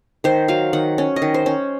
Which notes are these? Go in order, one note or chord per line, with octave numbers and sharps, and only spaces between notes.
D#3 C5
F#3 F5
D#3 F#5
C#4
D#5
D#3
C5
C#4